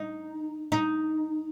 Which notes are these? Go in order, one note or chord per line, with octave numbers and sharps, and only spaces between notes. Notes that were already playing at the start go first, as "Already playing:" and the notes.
Already playing: D#4
D#4